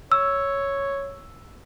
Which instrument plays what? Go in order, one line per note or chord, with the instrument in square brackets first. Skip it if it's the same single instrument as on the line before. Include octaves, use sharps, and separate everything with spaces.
[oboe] C#5 [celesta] E6